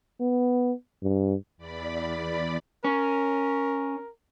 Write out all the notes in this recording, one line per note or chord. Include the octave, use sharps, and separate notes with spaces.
B3
G2
E2 D5 B5
C#4 A#4